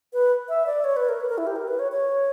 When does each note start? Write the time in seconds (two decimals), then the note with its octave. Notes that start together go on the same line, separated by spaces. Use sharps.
0.13 B4
0.49 E5
0.66 D5
0.84 C#5
0.96 B4
1.09 A#4
1.20 B4
1.29 A#4
1.38 E4
1.47 G4
1.56 A#4
1.67 B4
1.79 C#5
1.92 C#5